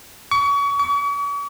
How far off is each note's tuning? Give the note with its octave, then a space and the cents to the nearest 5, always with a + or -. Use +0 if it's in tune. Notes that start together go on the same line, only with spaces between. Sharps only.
C#6 +35
C#6 +45